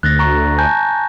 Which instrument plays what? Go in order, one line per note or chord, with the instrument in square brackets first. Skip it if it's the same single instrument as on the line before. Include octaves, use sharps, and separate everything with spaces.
[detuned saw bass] D2 [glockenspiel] F#6 A6 A#6
[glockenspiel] A#5 C#6
G#5 A5 G6